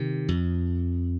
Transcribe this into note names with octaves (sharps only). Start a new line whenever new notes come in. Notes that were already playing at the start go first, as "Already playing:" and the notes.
Already playing: C3 D#3
F2